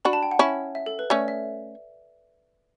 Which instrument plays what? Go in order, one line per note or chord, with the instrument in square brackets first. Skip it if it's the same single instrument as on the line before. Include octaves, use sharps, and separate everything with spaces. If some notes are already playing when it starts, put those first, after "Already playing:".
[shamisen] D4 F#4 [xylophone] B5
[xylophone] A5
G5
F#5
[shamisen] C#4 E4
[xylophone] E5
A4
B4
[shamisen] A3 C#4 [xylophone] D5
[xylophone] E5